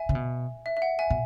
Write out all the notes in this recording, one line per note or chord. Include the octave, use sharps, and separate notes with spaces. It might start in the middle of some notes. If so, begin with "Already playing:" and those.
Already playing: E5 G#5
C#3
B2
E5
E5
F#5
E5 G#5
B2